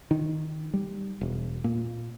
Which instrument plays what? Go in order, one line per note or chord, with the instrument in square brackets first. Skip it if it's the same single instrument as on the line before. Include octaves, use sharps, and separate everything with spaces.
[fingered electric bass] D#3
G3
E1
A#2